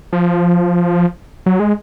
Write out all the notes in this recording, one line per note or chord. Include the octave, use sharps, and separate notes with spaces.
F3
F#3
G#3